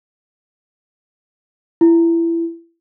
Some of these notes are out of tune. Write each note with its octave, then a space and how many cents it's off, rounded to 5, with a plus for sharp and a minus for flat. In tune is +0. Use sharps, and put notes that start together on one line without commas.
E4 +20